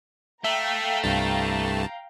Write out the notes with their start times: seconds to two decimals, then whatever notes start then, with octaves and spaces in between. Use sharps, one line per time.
0.44 A3 E5 F5 G5 A#5
1.03 C2 G2 A5